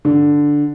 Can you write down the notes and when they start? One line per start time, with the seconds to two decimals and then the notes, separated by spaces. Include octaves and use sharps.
0.05 D3